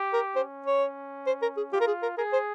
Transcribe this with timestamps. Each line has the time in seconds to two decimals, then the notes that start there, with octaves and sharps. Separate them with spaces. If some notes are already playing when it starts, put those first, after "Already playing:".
Already playing: G4
0.13 A#4
0.36 C#4 C5
0.66 C#5
1.27 C5
1.42 A#4
1.57 G#4
1.72 F4 G4
1.80 A#4
1.87 G#4
2.03 A#4
2.18 G#4 A#4
2.33 C5